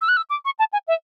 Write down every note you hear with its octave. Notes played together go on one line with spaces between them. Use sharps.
E6
F#6
E6
D6
C#6
A5
G#5
E5